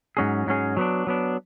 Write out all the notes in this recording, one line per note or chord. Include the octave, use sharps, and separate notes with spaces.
G#2 F#3 C#4 G#4
G#2 F#3 C#4 G#4
F#3 B3 D4
F#3 B3 D4